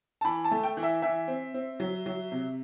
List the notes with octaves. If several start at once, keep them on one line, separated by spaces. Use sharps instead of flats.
A5
E3 B5
A5
A3
G5
E3
E5
E3 E5
C4
C4
F#3
F#3
C3